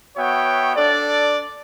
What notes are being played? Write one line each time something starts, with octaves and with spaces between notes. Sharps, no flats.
B3 F#4 C#5 E5 G5
D4 A4 D5